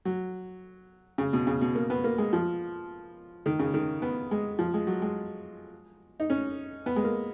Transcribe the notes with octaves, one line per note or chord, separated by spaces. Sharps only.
F#3
C#3
B2
C#3
B2
A#3
B3
A#3
G#3
F3
D#3
C#3
D#3
B3
G#3
F3
G#3
F#3
G#3
D#4
C#4
B3
G#3
A#3